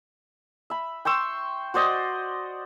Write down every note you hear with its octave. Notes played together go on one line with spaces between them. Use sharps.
E5 B5
G5 C6 C#6 E6
F#4 C5 D5 D#5